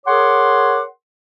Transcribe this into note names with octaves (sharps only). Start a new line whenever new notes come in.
G#4 A#4 C#5 F#5 C6 D6